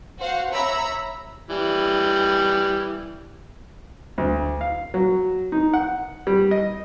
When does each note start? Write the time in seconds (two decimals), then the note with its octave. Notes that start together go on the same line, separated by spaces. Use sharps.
0.18 F#4 C5 F5 F#5
0.50 C#5 E5 A#5 B5 E6
1.50 E3 G3
4.18 D2
4.61 F5
4.94 F#3
5.52 D#4
5.74 F#5
6.27 G3
6.51 D#5